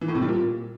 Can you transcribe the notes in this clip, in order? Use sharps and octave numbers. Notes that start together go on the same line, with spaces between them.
E3
A2
C3
G3
A#2